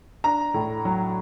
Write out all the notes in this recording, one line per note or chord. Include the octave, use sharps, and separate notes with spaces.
D4 A#5
A2
F#3